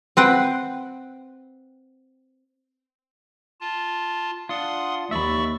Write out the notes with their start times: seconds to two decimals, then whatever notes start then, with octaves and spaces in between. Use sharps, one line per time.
0.17 C4 B4 F#5 G5
3.61 F4 A5
4.49 D4 F4 F#5 C6 D#6
5.11 D#2 D5 E5 B5 C#6 E6